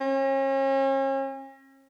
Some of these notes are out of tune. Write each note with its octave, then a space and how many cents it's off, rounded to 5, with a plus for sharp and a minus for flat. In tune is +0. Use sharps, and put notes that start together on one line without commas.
C#4 -40